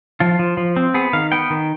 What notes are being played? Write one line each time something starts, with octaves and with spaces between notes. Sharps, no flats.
F3 F4
F3
F3
C4
B3 G#4
D#3 F5
B3 G5
D#3